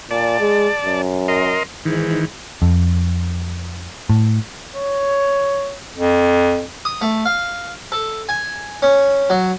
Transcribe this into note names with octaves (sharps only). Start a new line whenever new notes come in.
A#2 D5 A5
G#3
F#2
A#4 D#5 C6
G#2 D#3 E3
F2
A2
C#5
F2
D#6
A3
F5
A4
G#5
C#4
F#3